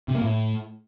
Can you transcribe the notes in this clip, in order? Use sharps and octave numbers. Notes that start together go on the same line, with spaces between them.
C3
A#3
A2